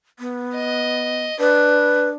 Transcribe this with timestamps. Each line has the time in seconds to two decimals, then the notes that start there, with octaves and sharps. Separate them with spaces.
0.19 B3
0.54 D#5
1.40 D4 B4